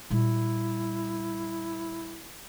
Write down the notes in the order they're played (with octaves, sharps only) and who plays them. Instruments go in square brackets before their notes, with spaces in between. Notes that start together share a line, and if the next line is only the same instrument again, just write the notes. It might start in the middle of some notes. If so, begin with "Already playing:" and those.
[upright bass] A#2 G3 [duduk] E4